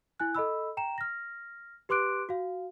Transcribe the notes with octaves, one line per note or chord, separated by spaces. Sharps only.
E4 G#5 F#6
A4 D#5 B5 E6
G5 A#5 E7
F6 A#6
G4 B4 C6 D6 F#6 D7
F#4 F5